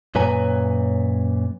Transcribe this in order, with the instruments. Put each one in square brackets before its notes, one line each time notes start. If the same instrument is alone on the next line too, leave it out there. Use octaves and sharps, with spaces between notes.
[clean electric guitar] F#2 A#2 B4 C#5 G#5 A#5